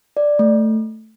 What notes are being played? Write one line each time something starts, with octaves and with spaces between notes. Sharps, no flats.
D5
A3